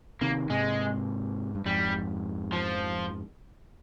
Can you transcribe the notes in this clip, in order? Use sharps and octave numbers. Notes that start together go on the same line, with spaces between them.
C3 D#3 A#3
G#2 C3 G#3
G2
F2 G#2 G3
F3